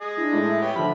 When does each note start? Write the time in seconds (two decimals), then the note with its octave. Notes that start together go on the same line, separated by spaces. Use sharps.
0.02 G#4 D#5
0.17 D4 E4
0.33 A2 G#3 E4
0.47 E5
0.62 B3 G4 C#5 G5
0.76 D3 F3 B5